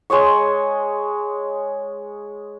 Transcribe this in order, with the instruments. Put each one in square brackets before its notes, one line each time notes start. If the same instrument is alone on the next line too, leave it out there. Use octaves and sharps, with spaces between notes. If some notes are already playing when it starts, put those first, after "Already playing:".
[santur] G#3 C#5 D#5 C#6